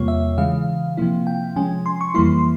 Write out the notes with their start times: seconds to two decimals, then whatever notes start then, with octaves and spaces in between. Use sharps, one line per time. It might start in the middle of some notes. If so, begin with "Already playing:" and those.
Already playing: E2 C3 G3 A#3 F4 C#5
0.08 E5
0.38 C#3 E3 G#3 F5
0.97 C3 F3 A#3 E4
1.27 G5
1.56 C3 F3 G#3 C#4 G#5
1.86 C6
2.01 C#6
2.14 F2 E3 G3 A#3 E4 C6